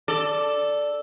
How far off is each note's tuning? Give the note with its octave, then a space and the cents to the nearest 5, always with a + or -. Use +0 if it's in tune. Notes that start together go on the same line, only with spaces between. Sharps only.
A4 +0 D5 +0